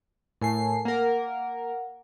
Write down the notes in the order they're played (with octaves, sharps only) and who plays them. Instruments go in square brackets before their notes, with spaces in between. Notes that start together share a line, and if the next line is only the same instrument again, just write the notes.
[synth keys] A2 C7 [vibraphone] A#4 G#5 A5
[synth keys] A#3 A#4 [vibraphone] F#5